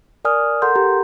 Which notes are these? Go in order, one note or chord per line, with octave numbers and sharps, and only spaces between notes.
A#4 D5 G#5 D#6 F6
A4 A#4 F#5 A#5 C6 G6
G4 A#5